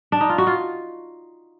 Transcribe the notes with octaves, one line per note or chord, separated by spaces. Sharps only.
D4
D#4
F4
F#4
F4